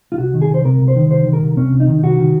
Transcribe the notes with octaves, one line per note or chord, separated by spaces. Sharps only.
F4
C2 F#4
D#3
G#4
C2 C5
C3 A#4
C2
C5
D#3
C2 C5
D#3
A#4
C2
C3 C#4
C2
D#4
D#3
C2 F#4
D#3